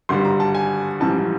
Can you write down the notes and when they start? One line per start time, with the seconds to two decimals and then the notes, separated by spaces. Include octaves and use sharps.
0.09 G#1 G2 D3 G3 C6
0.25 A#5
0.40 A5
0.55 G#5
1.00 A#1 G#2 E3 G3 A5